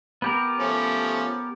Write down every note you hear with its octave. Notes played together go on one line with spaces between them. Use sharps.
B3 G4 A#4
F3 A3 C#4